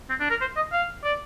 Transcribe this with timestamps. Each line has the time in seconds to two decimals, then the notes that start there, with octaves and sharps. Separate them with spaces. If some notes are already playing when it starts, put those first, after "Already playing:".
0.09 C4
0.20 D4
0.30 A#4
0.41 C5
0.56 D#5
0.73 F5
1.04 D5